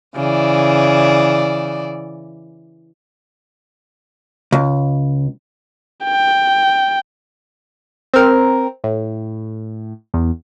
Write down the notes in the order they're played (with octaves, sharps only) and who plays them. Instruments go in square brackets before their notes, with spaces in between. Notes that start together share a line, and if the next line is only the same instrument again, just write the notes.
[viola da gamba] C#3 E3 D5
[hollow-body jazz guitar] C#2
[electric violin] G5
[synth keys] C4 A#4
A2
E2